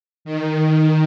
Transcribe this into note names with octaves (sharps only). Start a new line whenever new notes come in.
D#3